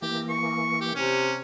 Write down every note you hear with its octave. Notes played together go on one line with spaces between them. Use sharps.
E3 A#3 G4
C#6
G4
C3 C#4